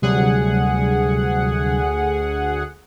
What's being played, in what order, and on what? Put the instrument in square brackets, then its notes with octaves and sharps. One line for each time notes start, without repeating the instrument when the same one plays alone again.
[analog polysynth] D2 G#4 F#5 [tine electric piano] C3 F#3 G3